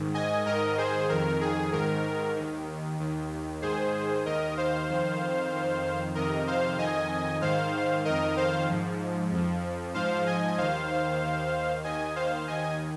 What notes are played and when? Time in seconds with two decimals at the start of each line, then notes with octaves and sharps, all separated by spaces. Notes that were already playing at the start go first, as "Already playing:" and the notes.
Already playing: G#2 D#3
0.14 D#5 G#5
0.46 G#2 D#3 A#4 D#5
0.77 G#4 C5
1.09 F2 D#3 A#4
1.41 G#4
1.72 G#2 D#3 A#4
2.35 D#2 D#3
2.99 D#2 D#3
3.62 G#2 D#3 G#4 C5
4.26 D#2 D#3 A#4 D#5
4.57 C5 F5
4.89 F2 D#3
5.52 F2 D#3
6.15 F2 C3 D#3 A#4 D#5
6.47 C5 F5
6.78 F2 D#3 D#5 G#5
7.41 G#2 D#3 C5 F5
8.05 F2 D#3 A#4 D#5
8.37 C5 F5
8.68 G#2 F3
9.31 F2 F3
9.94 G#2 F3 C5 F5
10.26 D#5 G#5
10.58 D#2 D#3 C5 F5
11.21 D#2 D#3
11.84 D#2 D#3 D#5 G#5
12.16 C5 F5
12.47 D#2 D#3 D#5 G#5